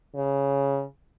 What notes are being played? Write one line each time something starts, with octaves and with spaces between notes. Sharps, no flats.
C#3